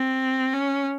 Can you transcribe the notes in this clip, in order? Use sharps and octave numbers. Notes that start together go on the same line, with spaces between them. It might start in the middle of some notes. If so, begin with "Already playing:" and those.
Already playing: C4
C#4